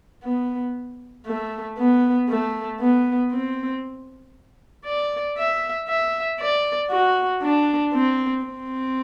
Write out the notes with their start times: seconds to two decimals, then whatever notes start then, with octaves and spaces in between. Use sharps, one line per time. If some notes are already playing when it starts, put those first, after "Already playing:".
0.23 B3
1.26 A3
1.78 B3
2.29 A3
2.80 B3
3.32 C4
4.85 D5
5.37 E5
5.88 E5
6.40 D5
6.90 F#4
7.42 D4
7.93 C4
8.44 C4